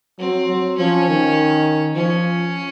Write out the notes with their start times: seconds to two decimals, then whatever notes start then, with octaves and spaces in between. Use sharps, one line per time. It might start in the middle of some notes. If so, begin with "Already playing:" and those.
0.19 F#3 C4
0.48 F#3
0.77 F3 C#4
1.07 D#3
1.95 F3 C#4